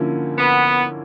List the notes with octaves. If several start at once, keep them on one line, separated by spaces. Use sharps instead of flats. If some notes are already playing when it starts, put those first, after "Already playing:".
Already playing: D3 F3 A#3 C#4 E4
B3